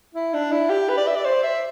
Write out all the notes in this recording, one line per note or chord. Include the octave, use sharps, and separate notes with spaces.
E4
D4
E4
G4
B4
D5
E5
D5
C5
E5